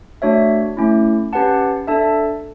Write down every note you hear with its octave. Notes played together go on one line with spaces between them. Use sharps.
A3 D4 F#4 C#5 E5
A3 C#4 E4
C#4 G4 B4 F#5 A5
D4 A4 E5 A5